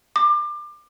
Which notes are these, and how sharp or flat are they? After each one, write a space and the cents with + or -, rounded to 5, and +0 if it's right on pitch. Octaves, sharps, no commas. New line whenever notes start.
D6 +25